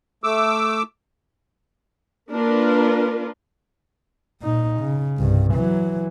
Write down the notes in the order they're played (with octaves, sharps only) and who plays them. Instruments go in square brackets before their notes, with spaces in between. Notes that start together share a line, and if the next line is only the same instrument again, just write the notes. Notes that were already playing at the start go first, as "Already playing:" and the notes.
[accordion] A3 D6 E6
[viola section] A#3 D4 F4 A#4 B4
[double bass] A#2 D#4
C#3
C2 G2
E3 F#3